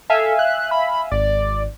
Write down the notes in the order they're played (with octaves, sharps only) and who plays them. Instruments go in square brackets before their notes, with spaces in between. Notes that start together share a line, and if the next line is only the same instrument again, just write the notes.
[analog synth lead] A4 [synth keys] E5 F5 G#5
[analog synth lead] F#6
B5
[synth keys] G#1 [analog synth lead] D5